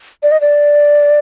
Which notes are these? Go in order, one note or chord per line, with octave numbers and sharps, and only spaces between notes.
D5
D#5
D5